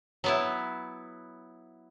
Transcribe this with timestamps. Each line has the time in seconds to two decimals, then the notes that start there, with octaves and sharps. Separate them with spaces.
0.24 F#3 B3 E4